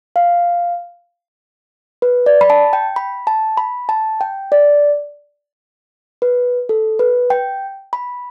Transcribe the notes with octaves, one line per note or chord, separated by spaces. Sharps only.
F5
B4
D5
B5
A5
G5
B5
A5
B5
A5
G5
D5
B4
A4
B4
G5
B5